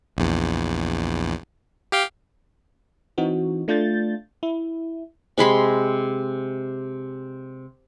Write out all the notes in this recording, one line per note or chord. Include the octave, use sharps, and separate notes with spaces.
A#1 E2
G4 F5 G5
E3 C4 D#4 F#4
A3 D4 F4 G6 A6
E4
C3 G#3 B5 C6